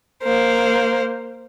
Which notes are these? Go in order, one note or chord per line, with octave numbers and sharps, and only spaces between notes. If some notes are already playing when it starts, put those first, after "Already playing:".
A#3 C5